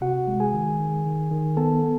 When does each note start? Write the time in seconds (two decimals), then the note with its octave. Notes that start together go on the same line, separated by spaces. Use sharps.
0.01 C3 F#4 F#5
0.28 G#3
0.40 G#4 G#5
0.53 D#3
0.79 D#3
1.06 D#3
1.31 D#3
1.57 B3 A4 A5
1.84 B3